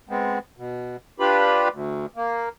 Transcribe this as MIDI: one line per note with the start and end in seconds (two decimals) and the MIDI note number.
0.09 0.39 56
0.09 0.39 59
0.09 0.39 60
0.57 0.96 47
1.20 1.68 62
1.20 1.68 65
1.20 1.68 67
1.20 1.68 71
1.20 1.68 83
1.71 2.06 38
2.16 2.49 58